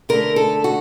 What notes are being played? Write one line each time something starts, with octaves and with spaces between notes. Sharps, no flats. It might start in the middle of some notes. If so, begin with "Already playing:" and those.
D3 A3 A#4
A4
F#4